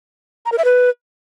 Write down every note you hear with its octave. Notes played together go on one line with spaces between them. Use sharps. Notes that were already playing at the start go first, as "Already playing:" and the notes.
A#5
A#4
E5
B4